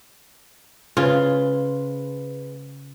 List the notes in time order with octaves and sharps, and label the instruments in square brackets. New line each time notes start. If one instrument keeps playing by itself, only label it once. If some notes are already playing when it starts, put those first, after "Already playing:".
[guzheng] C#3 [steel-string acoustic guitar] G#3 B4 C5 [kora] F4